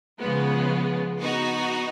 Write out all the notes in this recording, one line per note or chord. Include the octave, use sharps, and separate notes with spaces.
C#3 F3 G#3 B3
B3 D#4 F#4